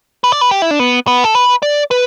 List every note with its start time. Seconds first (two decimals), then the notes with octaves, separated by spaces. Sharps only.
0.24 B4
0.32 D5
0.41 B4
0.51 G4
0.62 E4
0.71 D4
0.79 B3
1.07 B3
1.24 A4
1.35 B4
1.62 D5
1.91 B4